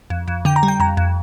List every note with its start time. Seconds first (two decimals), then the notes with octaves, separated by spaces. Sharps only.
0.10 F2
0.28 F2
0.45 D3 G5
0.56 A#5
0.63 G3
0.68 G5
0.80 F2 A#5
0.97 F2